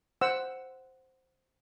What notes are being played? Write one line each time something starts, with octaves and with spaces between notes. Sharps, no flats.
C5 F#5 E6